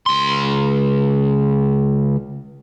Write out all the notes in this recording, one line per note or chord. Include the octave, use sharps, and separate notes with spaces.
C#2 C6